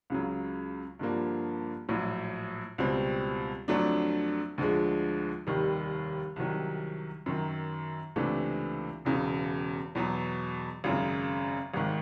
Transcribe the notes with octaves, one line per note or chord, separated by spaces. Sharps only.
C#2 C#3 F#3
G2 D3 F3 A#3
A#1 A2 F#3
C#2 B2 G3 C4
F2 D3 F#3 A3 D4
D2 D3 F3 G#3
F1 D#2 D#3 G3
C2 C3 D#3 F#3
F#2 D#3 F#3
C#2 C3 E3 A3 D4
E1 E2 C#3
E2 B2 F#3
G#1 F#2 C#3
G#1 G#2 D#3